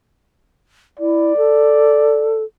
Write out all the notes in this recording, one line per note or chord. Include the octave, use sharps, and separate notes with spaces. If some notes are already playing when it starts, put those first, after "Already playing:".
E4 D5
A4